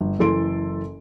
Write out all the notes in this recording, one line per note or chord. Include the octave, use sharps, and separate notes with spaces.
G1
F#1 E3 A4 C6 D7